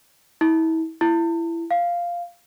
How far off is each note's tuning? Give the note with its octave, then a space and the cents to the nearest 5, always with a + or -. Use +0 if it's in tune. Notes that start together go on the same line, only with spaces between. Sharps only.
E4 -35
E4 +20
F5 -5